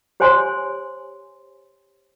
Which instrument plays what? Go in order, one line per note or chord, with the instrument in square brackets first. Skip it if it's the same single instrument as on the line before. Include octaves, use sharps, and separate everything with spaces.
[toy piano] G4 C5 C#5 G#5 C6